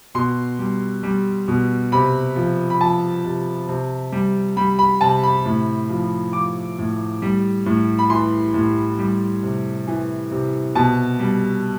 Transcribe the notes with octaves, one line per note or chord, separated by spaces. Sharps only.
B2 C6
G3
G3
B2
C3 B5
F3
B5
F3 A5
C3
C3
G3
G3 B5
B5
C3 A5
B5
A2
F3
F3 D6
A2
G3
A2
B5
E3 C6
A2
G3
C3
E3
C3
B2 A5
G3